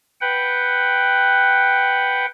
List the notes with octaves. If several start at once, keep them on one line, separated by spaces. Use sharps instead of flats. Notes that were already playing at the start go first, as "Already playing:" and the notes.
B4 F#5 G5